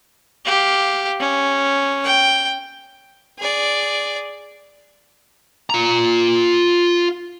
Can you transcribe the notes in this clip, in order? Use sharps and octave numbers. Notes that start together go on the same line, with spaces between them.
G4 F5
C#4
G5
G#4 D5
F4 A#5